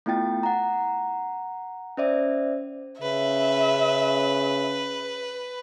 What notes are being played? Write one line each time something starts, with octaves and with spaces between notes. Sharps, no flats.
A3 B3 E4 F4 G5 A6
F#5 A#5
C#4 C5 D5 E5
C#3 B4 E5